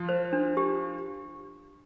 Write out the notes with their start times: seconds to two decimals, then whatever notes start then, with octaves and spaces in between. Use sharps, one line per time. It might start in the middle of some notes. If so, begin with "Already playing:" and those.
Already playing: F3 F4
0.09 C5
0.33 D4
0.57 G4